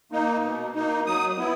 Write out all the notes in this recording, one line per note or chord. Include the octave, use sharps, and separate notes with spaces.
A#3 D#4
B2
A#3 D#4
F#3 D#6
B3 E4